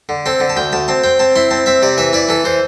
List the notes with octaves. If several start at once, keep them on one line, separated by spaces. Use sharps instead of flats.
D3
C4 A4
D3
A5
D2 G5
D2 A5
C4 A5
C4 G5
C4 A5
E4 C6
C4 A5
C4 E5
C3 D5
E3 E5
E4 D5
E3 A4
E3 C5